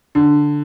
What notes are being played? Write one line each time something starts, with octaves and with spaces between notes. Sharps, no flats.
D3